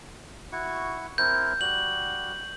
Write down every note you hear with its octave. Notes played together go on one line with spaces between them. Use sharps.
E4 F#4 C#6
C4 E4 A#4 G6
G3 F#4 F#7